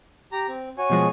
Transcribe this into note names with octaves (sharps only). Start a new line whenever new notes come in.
G4 A#5
C4
F#4 C#5 G#5
B2 F3 G#3